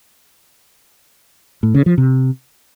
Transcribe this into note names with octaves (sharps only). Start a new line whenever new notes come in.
A2
C#3
F3
C3